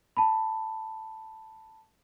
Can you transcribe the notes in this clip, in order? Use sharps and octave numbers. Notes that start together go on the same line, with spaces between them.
A5 B5